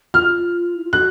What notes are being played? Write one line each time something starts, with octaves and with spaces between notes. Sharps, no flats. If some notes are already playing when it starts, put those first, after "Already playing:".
F4 F6
E4
F4
F#4 F#6